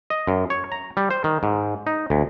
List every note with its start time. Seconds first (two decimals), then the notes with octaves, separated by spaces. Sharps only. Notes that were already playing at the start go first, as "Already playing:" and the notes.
0.10 D#5
0.27 F#2
0.50 C#5
0.72 A#5
0.97 G3
1.10 C5
1.24 D#3
1.43 G#2
1.87 D#4
2.10 D2